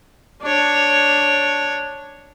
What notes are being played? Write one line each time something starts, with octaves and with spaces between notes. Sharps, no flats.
D4 C#5